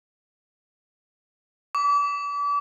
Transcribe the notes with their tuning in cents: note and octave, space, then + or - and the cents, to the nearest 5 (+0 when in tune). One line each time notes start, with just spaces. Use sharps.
D6 -35